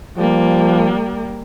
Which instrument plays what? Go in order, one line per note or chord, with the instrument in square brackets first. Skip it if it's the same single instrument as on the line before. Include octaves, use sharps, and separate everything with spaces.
[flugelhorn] F3 [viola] G3 A#3